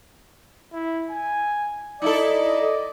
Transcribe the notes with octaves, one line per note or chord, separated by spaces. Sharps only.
E4
G#5
D#4 E4 A4 D5 D#5